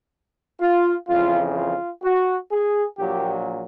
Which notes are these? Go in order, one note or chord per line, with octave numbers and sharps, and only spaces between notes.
F4
F2 C#3 E3 F4
F4
F#4
G#4
A#1 A#2 F#3 G4